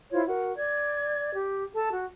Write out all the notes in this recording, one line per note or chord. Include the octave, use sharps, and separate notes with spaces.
E4 F4 C5 C#5
F#4 A#4
D5 G#6
G4
A4 A5
F#4